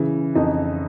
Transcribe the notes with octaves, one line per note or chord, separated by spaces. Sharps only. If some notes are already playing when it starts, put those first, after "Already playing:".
Already playing: C#3 E3
F2 D#4